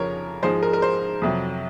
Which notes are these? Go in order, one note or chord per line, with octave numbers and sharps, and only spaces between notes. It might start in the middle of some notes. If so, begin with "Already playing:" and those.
Already playing: F2 C#3 F3 A#4 C#5
G#2 F3 G#3 C5
A#4
A#4
C5
F2 C3 F#3